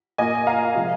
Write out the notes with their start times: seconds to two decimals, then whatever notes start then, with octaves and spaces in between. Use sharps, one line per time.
0.18 A#2 A#3 F4 D#5 G#5
0.47 F5 A#5
0.74 C3 F3 G#3